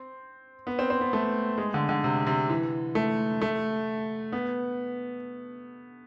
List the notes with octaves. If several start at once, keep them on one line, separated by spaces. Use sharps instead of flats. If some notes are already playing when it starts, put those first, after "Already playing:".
Already playing: C4
B3
C4
C4
B3
A3
G#3
D3
D3
C3
C3
E3
A3
A3
B3